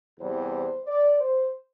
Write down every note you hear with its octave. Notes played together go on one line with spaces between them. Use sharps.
E2 C3 E3 G3 C5
D5
C5